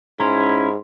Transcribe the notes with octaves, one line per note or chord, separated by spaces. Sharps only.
G#2 C#4 E4 A#5 C6